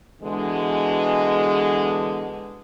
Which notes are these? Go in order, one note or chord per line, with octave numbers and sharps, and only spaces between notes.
B2 D3 E3 G#3